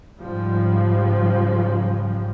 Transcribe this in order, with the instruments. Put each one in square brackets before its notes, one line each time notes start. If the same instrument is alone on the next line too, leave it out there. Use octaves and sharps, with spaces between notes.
[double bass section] G#2 C#3 F3 G3